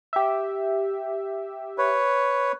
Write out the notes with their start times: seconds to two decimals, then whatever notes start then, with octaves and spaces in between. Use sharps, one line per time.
0.13 G4 E5
1.78 B4 C#5